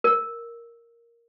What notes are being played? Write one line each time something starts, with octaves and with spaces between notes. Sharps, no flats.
A#4